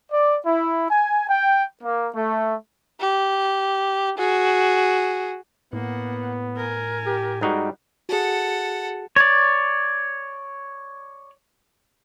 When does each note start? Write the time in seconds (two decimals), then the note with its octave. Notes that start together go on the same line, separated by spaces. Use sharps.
0.12 D5
0.45 E4
0.90 G#5
1.28 G5
1.83 A#3
2.15 A3
3.00 G4
4.18 F#4 G#4
5.73 A2 A#3 B3 F#5
6.57 A#4 G#5
7.06 G4
7.41 G#2 G3 D#4 F#4
8.09 F#4 G#4 A4 F#5
9.16 C#5 D5